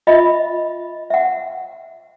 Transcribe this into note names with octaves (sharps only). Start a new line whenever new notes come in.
F4 D#5 E5 B5
E5 F#5